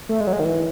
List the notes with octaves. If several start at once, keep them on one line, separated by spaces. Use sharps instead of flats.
A3
G#3
F#3
G#3
D#3
E3